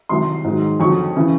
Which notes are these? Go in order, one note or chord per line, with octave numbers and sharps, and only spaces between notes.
C2 C3 D#3 F#3 C6
G#2 D#3 F#3
F2 D3 F#3 C#6
C#3 E3